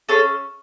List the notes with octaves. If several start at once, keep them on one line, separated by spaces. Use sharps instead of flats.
C#4 G#4 A4 C#5